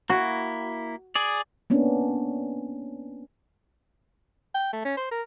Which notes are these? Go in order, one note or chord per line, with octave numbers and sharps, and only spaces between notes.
A#3 E4 F#4
G#4 D5
A#3 B3 C#4 D4
G5
A3
C#4
C5
A#4